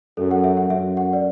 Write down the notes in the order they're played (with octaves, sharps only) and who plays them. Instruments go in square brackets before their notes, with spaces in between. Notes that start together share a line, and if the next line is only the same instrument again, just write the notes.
[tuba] F#2 [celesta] A4
[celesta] F#5
E5
F#5
[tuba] F#2 [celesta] E5
[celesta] F#5
D5